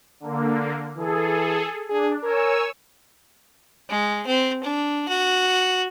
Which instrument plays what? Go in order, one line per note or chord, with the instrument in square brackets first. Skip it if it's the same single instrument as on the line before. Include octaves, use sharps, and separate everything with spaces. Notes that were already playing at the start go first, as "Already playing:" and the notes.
[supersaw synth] D3 A#3
[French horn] E3 [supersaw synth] G#4 A4
[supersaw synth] D4 [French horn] G#4
[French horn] A#4 [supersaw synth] C#5 G#5 E6
[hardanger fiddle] G#3
C4
D4
F#4